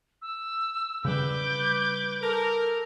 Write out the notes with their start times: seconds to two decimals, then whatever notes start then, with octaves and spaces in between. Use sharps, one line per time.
0.22 E6
1.05 C#3 G3 B4 D6 G6
2.22 A4 A#4